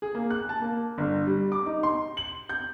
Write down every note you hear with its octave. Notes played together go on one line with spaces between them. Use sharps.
G#4
A#3
F#6
A5
A#3
G1
G3
D6
D#4
C6
F#7
G6